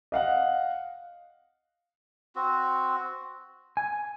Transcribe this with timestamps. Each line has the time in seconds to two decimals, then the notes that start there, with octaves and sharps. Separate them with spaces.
0.12 D#5 F5 F#5
2.36 C4 F#4
3.77 G#5